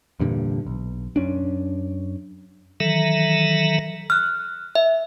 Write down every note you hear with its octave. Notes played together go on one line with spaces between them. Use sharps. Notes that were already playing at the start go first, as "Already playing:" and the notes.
E2 G2 A#2 D3
B1
F#2 C#4 D4
D#3 E3 F#3 A4 E5 A#5
F6 F#6
E5